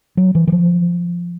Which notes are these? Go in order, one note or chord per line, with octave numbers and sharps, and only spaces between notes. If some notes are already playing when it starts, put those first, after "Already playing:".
F#3
E3
E3
F3